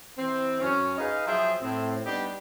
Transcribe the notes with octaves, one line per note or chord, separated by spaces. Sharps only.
E3 C4
F#2 C#4
D#4 G#4 B4 D#5 F5
F3 F#3 G#4 E5 G5
A2 C4
G3 B3 D4 D#4 G4